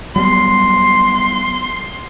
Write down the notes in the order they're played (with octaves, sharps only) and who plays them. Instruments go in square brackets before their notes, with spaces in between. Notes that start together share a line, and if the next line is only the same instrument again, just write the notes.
[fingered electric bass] F#3 G3 B3 [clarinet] C6